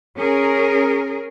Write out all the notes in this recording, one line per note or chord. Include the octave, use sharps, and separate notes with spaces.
C#4 G#4 A#4